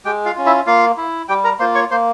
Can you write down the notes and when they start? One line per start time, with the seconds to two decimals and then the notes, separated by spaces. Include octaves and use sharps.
0.05 G#3 G4 G5
0.25 F4 F5
0.36 C#4 F4
0.46 E4 E5
0.66 A#3 F4 F5
0.98 E4
1.28 G3 G4 G5
1.44 A#4 A#5
1.60 A#3 F4 C5 C6
1.75 C#5 C#6
1.91 A#3 C5 C6